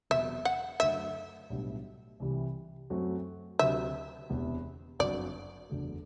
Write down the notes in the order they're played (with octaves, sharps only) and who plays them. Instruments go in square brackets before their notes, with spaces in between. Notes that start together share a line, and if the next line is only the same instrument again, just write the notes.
[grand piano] E1 E2 C3 F#3 B3 [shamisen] E5
[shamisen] F#5
[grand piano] F#2 D3 F#3 A3 [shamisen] E5
[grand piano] B1 A2 G3 B3 D4
C2 C3 E3 G3
F#2 F#3 A3 C4 F#4
[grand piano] D2 C3 F#3 C4 [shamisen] E5
[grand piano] E1 E2 C3 E3 B3
[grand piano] G1 F#2 F#3 C4 F#4 [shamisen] D5
[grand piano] F#1 E2 D3 F#3 A3